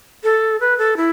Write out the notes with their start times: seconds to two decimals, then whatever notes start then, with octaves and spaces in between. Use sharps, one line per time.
0.24 A4
0.61 B4
0.78 A4
0.97 E4